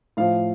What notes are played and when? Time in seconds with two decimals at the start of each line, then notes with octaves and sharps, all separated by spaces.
0.17 A2 F3 F5